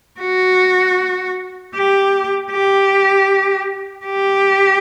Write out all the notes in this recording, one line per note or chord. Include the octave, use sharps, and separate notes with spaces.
F#4
G4
G4
G4